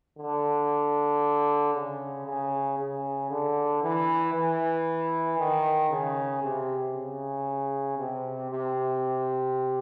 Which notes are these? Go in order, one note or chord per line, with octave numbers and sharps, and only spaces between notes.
D3
C#3
C#3
C#3
D3
E3
E3
D#3
C#3
C3
C#3
C3
C3